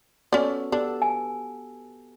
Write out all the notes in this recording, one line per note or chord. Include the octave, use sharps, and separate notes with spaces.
B3 C#4 F#4 A4 D5
B3 D4 G4 A4
G#5